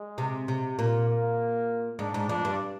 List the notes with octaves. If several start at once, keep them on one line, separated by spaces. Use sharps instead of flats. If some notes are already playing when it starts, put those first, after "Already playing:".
Already playing: G#3
C3
C3
A#2 A#3
A#3
G#2 D4
G#2
F2 D4
G2